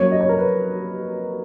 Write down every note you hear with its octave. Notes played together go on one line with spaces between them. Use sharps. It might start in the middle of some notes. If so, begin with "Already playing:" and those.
Already playing: C#3 F#3 A#3 C#5
D#5
C#5
A#4
B4